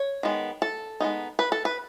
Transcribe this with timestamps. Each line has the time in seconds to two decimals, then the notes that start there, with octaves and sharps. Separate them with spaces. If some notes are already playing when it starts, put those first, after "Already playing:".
Already playing: C#5
0.23 D#3 G#3 B3
0.62 A4
1.00 G#3 B3 D#4
1.39 B4
1.52 A4
1.65 B4